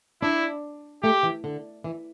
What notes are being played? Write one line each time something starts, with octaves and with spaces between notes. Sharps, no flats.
D4 E4
A3 G4
E3
D3
E3